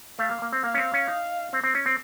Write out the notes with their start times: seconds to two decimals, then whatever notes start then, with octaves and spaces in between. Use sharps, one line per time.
0.19 A3 F5
0.31 A#3
0.42 A#3
0.53 C4
0.64 A#3 F5
0.74 C#4
0.78 C4
0.94 C#4
1.08 D#4
1.53 C4
1.64 C4
1.75 C#4
1.86 C4